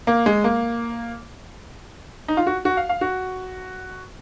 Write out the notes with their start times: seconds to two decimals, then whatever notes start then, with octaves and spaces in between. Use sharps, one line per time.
0.07 A#3
0.26 G#3
0.44 A#3
2.28 D#4
2.37 F4
2.47 F#4
2.65 F#4
2.77 F5
2.89 F5
3.01 F#4